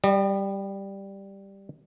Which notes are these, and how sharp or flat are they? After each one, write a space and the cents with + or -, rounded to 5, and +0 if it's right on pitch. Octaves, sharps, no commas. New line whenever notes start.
G3 +0 D#5 -45